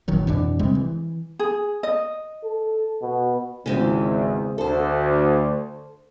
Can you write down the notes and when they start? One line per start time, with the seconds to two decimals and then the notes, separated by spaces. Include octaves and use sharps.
0.08 A1 D#3 F#3
0.27 F2 B2 E3 D4
0.59 C3 G3 G#3 C4
0.75 E3
1.39 G#4
1.83 D#5
2.44 A4
3.02 B2
3.66 G#1 E2 C#3 G#3 C4
4.58 D2 A4 C5